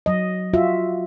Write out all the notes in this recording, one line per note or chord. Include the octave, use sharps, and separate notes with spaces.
F#3 D#5
F4 F#4 E5